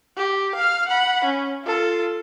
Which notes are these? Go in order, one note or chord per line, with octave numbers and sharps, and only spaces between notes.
G4
F5 F6
F#5 B5
C#4
F4 A4